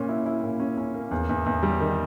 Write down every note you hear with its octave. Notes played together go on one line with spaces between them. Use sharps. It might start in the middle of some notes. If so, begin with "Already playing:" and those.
Already playing: A#2 C#4
E4
E4
A#2
C#4
C#4
A#3
E2
E2
E2
G3
D#3